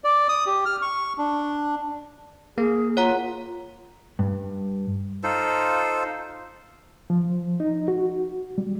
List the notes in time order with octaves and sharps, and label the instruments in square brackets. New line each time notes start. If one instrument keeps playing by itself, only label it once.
[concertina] D5
D#6
G4
F6
C#6
D4
[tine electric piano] A#3 [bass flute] G#4
[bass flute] F4 [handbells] C#5 F#5 A#5
[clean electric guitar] G2
[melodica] D#4 F4 A4 C5
[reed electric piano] F3
D#4
F#4
G3